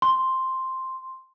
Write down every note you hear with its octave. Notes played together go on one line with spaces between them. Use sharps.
C6